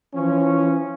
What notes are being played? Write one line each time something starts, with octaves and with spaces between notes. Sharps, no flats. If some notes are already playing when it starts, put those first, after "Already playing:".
E3 F3 C#4